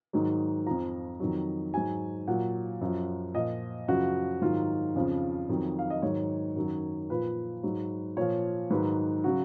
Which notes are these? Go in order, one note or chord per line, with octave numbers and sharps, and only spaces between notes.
G#2 D#3 F#3
F2 F3 A#5
F2 D#3 F#3
G#2 F#3 G#5
A#2 F#3 F#5
F#2 F3
A#2 F3 D#5
F#2 C#3 F3 F#4
G#2 D#3 F#3 F4
F2 C#3 F3
F2 D#3 F#3
F5
D#5
G#2 D#3 F#3 C#5
F#2 D#3 F#3
A#2 F3 B4
G#2 F#3
A#2 F3 C#5
G#2 D#3 F#3 B4
C#3 F#3 F#4